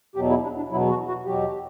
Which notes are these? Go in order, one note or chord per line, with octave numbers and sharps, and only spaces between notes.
E2 B2 F#3 G4
E4
D4
D4
E2 B2 F#3 E4
F#4
F#4
E2 B2 F#3 G4